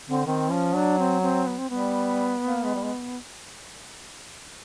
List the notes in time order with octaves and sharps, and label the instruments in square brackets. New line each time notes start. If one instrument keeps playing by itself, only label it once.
[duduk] D3 [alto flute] C4
[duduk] D#3 [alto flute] C4
[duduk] F3 [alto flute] C#4
[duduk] F#3 [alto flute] D4
[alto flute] C4
C4
B3
C4
[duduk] G3 [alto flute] B3
[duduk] A#3
G#3
G3
G#3